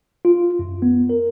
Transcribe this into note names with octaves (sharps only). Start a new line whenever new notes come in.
F4
F#2
B3
A#4